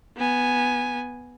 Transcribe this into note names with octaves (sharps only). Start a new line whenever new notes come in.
B3 G#5